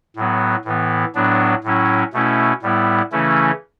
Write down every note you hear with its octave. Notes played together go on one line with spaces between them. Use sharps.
A2 F#3 B3
A2 E3 B3
A2 F#3 B3 D4
A2 F#3 C#4 E4
B2 A3 C#4 E4
A2 G3 B3 E4
C#3 E3 A3 C#4 E4